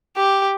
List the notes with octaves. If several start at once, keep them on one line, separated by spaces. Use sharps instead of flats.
G4